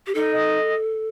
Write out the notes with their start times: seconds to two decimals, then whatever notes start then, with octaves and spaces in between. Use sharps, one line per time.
0.07 G4
0.15 D#4 A4
0.32 D#5